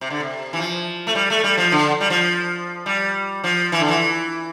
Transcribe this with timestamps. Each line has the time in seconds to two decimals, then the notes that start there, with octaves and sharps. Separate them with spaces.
0.01 C3
0.10 D3
0.20 C3
0.53 E3
0.59 F3
1.07 A3
1.15 G3
1.30 A3
1.44 G3
1.57 F3
1.72 D3
2.01 G3
2.10 F3
2.86 G3
3.44 F3
3.72 E3
3.80 D3
3.88 E3